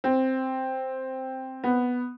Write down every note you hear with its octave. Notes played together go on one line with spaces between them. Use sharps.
C4
B3